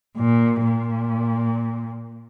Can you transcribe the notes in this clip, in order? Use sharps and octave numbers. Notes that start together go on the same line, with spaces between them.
A#2
A#2